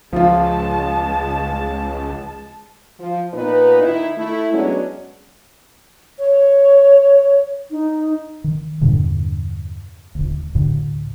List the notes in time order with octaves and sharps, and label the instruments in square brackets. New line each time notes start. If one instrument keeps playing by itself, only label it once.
[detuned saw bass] C#2 [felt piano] F3 F4 [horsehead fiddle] G#3 A5
[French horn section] F3
A#2 B3 D#4 B4
D#3 E4
A3 E4
F#3 G#3 B3 C#4 D4
[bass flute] C#5
D#4
[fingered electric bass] D#3
E2 G2 A#2 D3
D#1 D2
D2 A2 D3